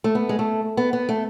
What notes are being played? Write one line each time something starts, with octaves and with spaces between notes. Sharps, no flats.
A3
B3
G#3
A3
B3
B3
A3